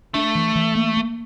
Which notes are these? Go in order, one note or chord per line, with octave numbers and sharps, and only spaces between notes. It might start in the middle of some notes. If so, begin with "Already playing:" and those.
A3 D4
E3
E3
A#3
A#3